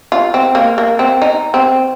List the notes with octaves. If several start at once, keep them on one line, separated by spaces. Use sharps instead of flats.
F4
C4
A#3
A#3
C4
D#4
C4